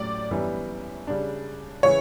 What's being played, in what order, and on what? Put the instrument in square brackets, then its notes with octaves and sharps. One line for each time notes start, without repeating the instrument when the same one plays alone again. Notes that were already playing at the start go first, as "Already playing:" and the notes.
Already playing: [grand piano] A2 F#3 C#4 G4 [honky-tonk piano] D5
[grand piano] F#2 E3 G3 B3 D4
C#3 G3 D4
[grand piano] C#3 E3 [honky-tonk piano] C#5